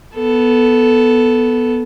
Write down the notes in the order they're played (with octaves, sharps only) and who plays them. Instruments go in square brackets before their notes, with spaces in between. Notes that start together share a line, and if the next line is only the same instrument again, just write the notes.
[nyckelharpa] B3 A4